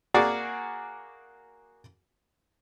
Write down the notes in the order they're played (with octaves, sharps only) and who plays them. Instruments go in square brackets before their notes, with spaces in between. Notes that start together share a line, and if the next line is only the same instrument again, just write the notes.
[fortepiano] A#3 F#4 G#4 D5